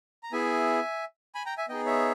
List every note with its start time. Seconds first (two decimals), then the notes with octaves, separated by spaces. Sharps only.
0.23 A#5
0.32 B3 E4 G#4 E5 G#5
1.35 G#5 B5
1.46 G5 A#5
1.58 E5 G#5
1.69 B3 D#4 G#4 D#5 G5
1.86 C#5 E5